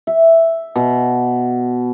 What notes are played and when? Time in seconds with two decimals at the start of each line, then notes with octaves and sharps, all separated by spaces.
0.07 E5
0.76 B2